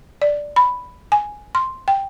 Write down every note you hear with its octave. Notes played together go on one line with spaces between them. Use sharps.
D5
B5
G#5
C6
G5